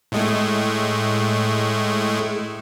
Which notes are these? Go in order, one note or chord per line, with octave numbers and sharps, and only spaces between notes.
A2 G#3 A3